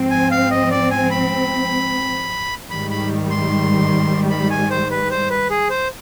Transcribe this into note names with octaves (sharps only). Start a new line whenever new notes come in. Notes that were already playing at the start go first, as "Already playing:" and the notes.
Already playing: G#2 F3 C4
G#5
F5
D#5
D5
G#5
B5
G#2 D#3 G3 B5
B5
C6
B5
G#5
C5
B4
C5
B4
G#4
C5